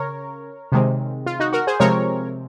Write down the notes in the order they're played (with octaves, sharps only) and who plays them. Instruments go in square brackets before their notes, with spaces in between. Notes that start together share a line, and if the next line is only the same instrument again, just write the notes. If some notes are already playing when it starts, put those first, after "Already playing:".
Already playing: [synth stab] C#3 A#4 C#5
C3 D#3 G#3 C4
F4
D#4 F#4
F#4 A#4
G#4 C5
C3 F3 G#3 C4 A#4 C#5